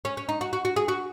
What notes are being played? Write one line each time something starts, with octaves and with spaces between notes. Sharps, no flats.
C#4
C#4
D#4
F#4
F#4
F#4
G#4
F#4